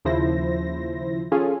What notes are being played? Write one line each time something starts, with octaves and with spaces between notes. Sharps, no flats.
D#2 C#3 F3 E4 C5 A#6
C#4 F4 G#4 A4